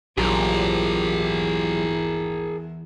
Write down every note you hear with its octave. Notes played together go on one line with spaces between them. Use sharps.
A#1 E2 F#3 E4 F4 G4 G#4 A#4